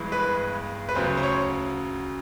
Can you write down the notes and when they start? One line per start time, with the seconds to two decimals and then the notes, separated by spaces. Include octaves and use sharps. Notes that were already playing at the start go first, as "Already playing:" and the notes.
Already playing: G1 G2 E3 G#3
0.12 B4
0.89 B4
0.95 D2 C#3 F#3 C5
1.17 C5
1.23 C#5